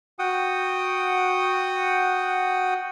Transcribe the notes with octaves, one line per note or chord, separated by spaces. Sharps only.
F#4 F#5 G5 D#6